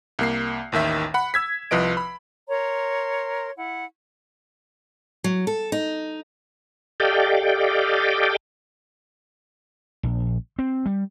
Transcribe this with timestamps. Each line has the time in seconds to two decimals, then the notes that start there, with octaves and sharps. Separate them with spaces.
0.19 C2 A#3 C7
0.72 A1 D#2 D#3 E5
1.14 F#5 B5
1.34 E6 G#6 B6
1.71 C2 F3 B4 D#5 D7
1.97 B5
2.49 A#4 C#5 A#5 C6
3.57 E4 F#5
5.24 F#3
5.47 A4
5.72 D#4
7.00 G4 A4 D5 D#5 F5 G5
10.03 A#1
10.59 C4
10.86 G3